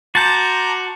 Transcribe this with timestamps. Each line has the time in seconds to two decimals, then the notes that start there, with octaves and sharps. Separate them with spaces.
0.15 F#4 A5 A#5 C6 D6 G6 A6